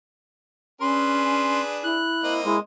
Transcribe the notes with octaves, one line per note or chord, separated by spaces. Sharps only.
C#4 D4 G#4 B4 C6
E4 F#6
A#3 C4 D#5
G#3 E4